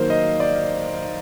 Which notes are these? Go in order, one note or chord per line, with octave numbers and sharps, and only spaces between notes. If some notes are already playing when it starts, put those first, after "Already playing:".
Already playing: D#3 F#3 A#3 A#4 C5
D#5
D5